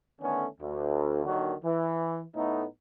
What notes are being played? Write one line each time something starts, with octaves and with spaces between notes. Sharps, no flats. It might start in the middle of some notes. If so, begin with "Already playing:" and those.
D3 D#3 A3 B3 C#4
D2
D#2 D3 D#3 F#3 D4 F#4
E3
A2 A3 B3 D#4